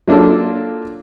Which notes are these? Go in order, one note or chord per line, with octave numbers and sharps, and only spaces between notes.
F#3 A#3 D4 F4 A4